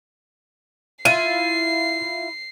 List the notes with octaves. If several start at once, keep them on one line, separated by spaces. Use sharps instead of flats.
E4 F4 C7 D#7